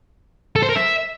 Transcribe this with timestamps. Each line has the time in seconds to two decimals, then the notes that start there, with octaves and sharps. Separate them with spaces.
0.56 A4
0.62 C5
0.69 A#4
0.76 E5